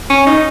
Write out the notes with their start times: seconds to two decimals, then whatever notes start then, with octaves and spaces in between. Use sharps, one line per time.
0.10 C#4
0.27 D#4